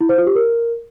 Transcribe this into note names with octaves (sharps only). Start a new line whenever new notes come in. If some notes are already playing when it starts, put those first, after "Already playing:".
E4
C5
F4
G4
A#4